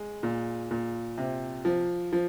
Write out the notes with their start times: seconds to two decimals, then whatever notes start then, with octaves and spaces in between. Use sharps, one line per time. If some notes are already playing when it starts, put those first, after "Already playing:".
Already playing: G#3
0.23 A#2
0.71 A#2
1.18 C3
1.65 F3
2.12 F3